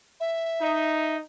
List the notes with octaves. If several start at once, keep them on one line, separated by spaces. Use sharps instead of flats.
E5
D#4